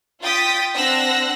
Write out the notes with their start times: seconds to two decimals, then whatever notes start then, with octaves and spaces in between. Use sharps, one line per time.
0.22 F4 G5 D#6 A6 B6 D7
0.75 C4 D4 F#5 E6 F#6 A#6